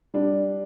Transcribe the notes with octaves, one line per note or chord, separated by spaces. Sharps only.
G3 D4